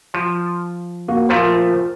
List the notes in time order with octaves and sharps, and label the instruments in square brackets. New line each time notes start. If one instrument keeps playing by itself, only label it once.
[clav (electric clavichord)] F3
[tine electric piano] A#3 F#4
[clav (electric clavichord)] A#2 F3 A3 [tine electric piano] F4 A#4 C5